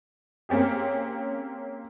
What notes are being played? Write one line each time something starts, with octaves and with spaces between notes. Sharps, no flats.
A#3 C4 C#4 G4 G#4